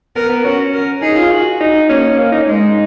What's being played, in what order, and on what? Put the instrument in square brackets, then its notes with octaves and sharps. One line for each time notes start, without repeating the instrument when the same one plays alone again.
[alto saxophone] B3 [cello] A#4
[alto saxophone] B3
[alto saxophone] C#4 [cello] F#4
[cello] A#4
[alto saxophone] D#4 [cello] G#4
[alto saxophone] F4
F#4
D#4
[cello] A#3 [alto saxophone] C#4
[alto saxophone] A#3
D#4
C#4
[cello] G#3 [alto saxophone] D#4